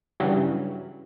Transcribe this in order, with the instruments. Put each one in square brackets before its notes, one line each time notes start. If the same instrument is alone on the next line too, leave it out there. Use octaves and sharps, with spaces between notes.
[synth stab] G2 C#3 E3 F#3 G3